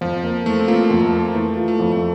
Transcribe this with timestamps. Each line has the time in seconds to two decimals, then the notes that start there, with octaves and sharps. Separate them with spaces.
0.01 F2 F3
0.23 A#3
0.45 E3 A3
0.59 C4
0.68 A#3 F4
0.90 F2
1.01 A3
1.13 A#3
1.35 E3 A3
1.57 F4
1.68 A3
1.80 F2
1.92 A3